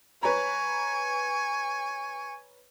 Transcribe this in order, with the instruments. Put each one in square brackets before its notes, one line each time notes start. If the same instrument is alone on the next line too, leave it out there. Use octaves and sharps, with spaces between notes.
[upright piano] B4 C#5 A#5 [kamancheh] G#5 C#6